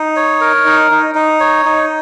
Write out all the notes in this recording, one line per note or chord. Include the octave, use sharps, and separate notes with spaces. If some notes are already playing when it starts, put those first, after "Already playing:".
Already playing: D#4
C#5
A#4
D#4
D#4
D#4
C#5
D#4